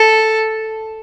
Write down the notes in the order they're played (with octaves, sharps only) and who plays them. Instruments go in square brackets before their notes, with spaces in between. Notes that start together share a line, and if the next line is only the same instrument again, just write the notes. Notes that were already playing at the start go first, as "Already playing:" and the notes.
Already playing: [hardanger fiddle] A4